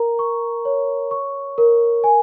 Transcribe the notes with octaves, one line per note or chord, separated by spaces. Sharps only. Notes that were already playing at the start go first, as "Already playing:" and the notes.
Already playing: A#4 A#5
C#6
C#5
C#6
A#4
G#5